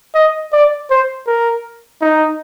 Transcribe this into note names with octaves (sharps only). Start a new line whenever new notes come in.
D#5
D5
C5
A#4
D#4